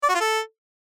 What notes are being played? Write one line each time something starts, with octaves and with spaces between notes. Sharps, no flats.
D5
F#4
F4
A4